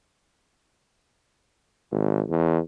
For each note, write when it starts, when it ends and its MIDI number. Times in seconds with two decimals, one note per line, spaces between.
1.92 2.23 32
2.29 2.59 40